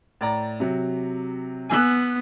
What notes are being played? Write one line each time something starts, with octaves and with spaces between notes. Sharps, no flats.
A2 D5 A#5
C3 F#3
B3 G#5 E6 F#6